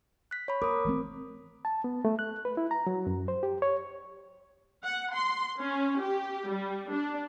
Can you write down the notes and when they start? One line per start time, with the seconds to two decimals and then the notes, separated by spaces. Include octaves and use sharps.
0.31 F#6 B6
0.48 C#5 B5
0.62 A#4 D6 D#6
0.85 E3 A3 C4
1.65 A5
1.84 B3
2.05 A3
2.19 F#6
2.45 B4
2.57 E4
2.71 A#5
2.87 F#3
3.07 F#2
3.28 C5
3.43 G4
3.62 C#5
4.84 F#5
5.14 C6
5.61 C#4
6.01 G4
6.51 G3
6.91 D4